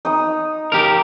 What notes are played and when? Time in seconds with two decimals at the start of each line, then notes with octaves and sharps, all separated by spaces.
0.05 D#4 D#6
0.72 G4 A#4